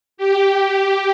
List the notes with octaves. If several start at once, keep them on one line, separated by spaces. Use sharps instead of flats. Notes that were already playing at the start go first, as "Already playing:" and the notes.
G4